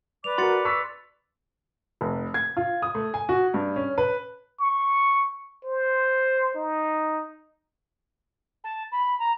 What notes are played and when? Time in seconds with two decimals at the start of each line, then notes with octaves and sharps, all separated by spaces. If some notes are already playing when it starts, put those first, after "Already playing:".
0.24 B4 D5 D6 F7
0.38 F#4 A#4 C6 A6 C#7
0.65 C#6 E6 B6
2.01 F1
2.34 G#6
2.57 F4
2.82 D#6
2.95 A3
3.14 G#5
3.29 F#4
3.54 G2
3.76 C#4
3.98 B4
4.59 C#6
5.64 C5
6.55 D#4
8.64 A5
8.92 B5
9.19 A#5